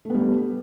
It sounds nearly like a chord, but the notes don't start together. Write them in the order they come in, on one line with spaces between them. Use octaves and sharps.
A3 B3 G3